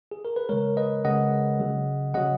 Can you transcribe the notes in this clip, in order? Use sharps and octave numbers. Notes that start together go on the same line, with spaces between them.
G#4
A#4
B4
C#3 G#3 A#4 C#5
B4 D#5
C#3 G#3 D#5 F#5
C#3 F#3
C#3 F#3 D#5 F#5